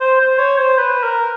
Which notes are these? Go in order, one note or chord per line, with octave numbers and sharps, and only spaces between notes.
C5
C5
C#5
C5
B4
A#4